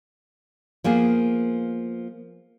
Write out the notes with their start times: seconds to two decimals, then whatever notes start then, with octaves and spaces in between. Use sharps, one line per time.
0.84 F3 A#3 B3 G#4